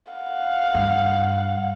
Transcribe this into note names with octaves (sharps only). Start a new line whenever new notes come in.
F5 F#5
G2